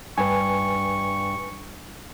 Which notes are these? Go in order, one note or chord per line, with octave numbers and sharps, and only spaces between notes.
G2 B4 G#5 C#6